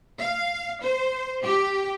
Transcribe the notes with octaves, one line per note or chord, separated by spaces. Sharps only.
F5
C5
G4